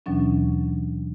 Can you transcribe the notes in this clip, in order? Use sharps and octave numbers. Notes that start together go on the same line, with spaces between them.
D#2 B2 E3 F#3 C#4 D4